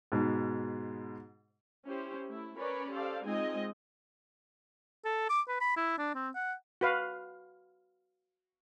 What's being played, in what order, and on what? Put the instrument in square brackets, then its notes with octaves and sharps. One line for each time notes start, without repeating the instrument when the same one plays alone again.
[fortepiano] G#2 B2
[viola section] C#4 E4 G4 C5
A3 E4
C#4 A#4 B4 C#5 D5 B5
G4 A4 C5 D5 F5
G#3 C4 D#4 F4 D#5 G#5
[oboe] A4
D6
B4
B5
E4
D4
C4
F#5
[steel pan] F#4 B4 F5